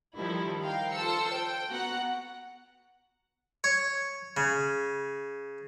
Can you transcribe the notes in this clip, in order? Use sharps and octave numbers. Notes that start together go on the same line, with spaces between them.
D#3 F3 G3 D#4 E4 A4
A#4 F5 G5
F4 A4 C5 E6 C#7
G5
B3 F#4 F#5 A#5
C#5
C#3